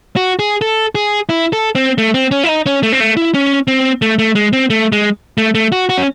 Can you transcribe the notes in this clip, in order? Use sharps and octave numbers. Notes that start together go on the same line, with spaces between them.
F#4
G#4
A4
G#4
E4
A4
C4
A3
C4
C#4
E4
D#4
C#4
A3
C4
A3
E4
C#4
C4
A3
A3
G#3
C4
A3
G#3
A3
A3
F#4
F#4
C#4